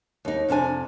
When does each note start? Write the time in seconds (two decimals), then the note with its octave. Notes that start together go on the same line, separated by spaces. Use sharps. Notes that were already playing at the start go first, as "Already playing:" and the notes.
0.25 D#2 D#4
0.48 F2 C3 D4 G#5